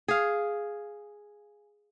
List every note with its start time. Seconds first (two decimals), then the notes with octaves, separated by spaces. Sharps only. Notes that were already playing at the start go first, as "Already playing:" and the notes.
0.08 G#4 F5